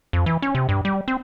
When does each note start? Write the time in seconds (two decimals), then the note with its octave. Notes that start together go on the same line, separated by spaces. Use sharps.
0.13 F2
0.26 E3
0.42 C#4
0.55 C3
0.69 G2
0.85 G3
1.08 C4